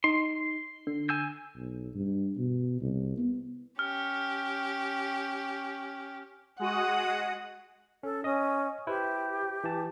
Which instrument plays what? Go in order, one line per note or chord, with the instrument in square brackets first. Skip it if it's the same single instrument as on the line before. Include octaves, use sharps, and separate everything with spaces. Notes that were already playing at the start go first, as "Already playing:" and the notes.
[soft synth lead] D#4 [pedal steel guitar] C6
[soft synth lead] D3
[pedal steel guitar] G#5 E6 G6
[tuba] B1
G2
B2
C2
B3
[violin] C#4 G4 [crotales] F6
[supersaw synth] G#3 F#4 D#6 [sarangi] F#5
[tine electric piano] C#4 [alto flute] A4
[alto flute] C#4 [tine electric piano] D#5 D#6
[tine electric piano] E4 B4 C5 [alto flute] G4
[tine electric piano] E3 A5